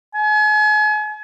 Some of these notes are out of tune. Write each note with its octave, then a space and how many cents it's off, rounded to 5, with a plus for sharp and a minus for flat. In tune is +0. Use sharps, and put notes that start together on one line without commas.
G#5 +40